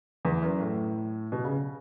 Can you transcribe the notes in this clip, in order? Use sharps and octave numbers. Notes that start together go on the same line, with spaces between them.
E2
F#2
A2
B2
C#3